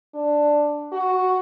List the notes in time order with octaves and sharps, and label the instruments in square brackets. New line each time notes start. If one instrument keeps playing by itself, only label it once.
[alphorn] D4
F#4